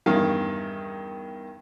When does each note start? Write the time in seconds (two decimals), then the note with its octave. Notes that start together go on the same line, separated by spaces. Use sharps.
0.06 E2 G2 D#3 C#4 F5